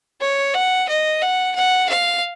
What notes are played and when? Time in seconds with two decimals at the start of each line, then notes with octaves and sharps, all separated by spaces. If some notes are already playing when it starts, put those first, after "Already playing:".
0.21 C#5
0.54 F#5
0.89 D#5
1.22 F#5
1.55 F#5
1.89 F5